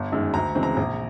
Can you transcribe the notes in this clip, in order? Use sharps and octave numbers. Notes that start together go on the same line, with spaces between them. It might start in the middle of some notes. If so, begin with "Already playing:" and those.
Already playing: G1
F#2 D#3 G#3
D2 A#5
C#3 E3 G#3 C4
A#5
A#1